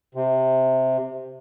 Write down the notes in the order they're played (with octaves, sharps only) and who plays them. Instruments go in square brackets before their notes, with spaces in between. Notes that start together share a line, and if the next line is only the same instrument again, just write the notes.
[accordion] C3